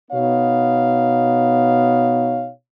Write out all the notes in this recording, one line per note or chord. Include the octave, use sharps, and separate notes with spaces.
B2 B3 D#4 C#5 F5